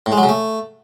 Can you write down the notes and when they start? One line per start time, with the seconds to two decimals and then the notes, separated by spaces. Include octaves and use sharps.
0.06 A2
0.12 G#3
0.18 F#3
0.23 C#3
0.29 A3